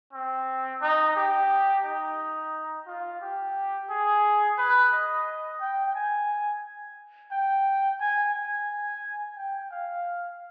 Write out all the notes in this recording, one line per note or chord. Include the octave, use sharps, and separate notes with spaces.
C4
D#4
G4
D#4
F4
G4
G#4
B4
D#5
G5
G#5
G5
G#5
G#5
G5
F5